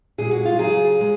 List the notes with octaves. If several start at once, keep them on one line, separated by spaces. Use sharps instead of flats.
A#2 G#3 G#4
F#4
F4
C#3 F#3 G#4
G#3